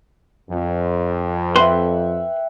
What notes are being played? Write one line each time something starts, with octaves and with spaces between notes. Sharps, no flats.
F2
B4 E5 F#5 G5 C6